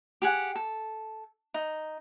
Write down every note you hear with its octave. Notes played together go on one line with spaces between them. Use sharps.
G4 G#4 F#5
A4
D#4